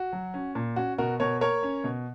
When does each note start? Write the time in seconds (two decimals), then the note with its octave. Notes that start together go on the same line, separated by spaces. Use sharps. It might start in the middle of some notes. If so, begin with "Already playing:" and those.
Already playing: F#4
0.13 F#3
0.34 C#4
0.55 A#2
0.76 C#4 F#4
0.98 B2 F#4 A#4
1.20 B2 A#4 C#5
1.41 A#3 A#4 C#5
1.63 C#4
1.84 B2